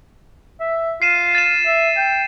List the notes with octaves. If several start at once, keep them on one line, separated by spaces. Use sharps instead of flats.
E5
F4 C7 D#7 E7
A6 E7
E5
G5